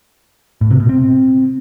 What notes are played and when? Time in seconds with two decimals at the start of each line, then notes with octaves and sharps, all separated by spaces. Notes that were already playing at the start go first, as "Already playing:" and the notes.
0.61 A2
0.71 C3
0.80 B2
0.89 C4